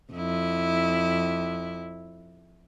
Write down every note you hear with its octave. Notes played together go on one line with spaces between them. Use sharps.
F2 E4